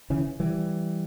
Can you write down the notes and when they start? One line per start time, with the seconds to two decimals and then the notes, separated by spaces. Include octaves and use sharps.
0.10 C#3 E3
0.40 E3 G3